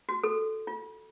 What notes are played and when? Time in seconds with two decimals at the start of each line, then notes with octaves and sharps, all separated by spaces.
0.09 F#4
0.24 A4
0.67 F4